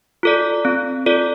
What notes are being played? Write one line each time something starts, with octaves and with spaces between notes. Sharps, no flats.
F4 A4 D5
C4
F4 A4 D5